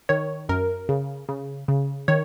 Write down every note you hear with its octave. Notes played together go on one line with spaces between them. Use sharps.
D#3 C#5
F#2 A#4
C#3
C#3
C#3
D#3 C#5